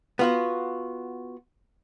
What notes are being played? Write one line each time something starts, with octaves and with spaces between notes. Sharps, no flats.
B3 F4 F#4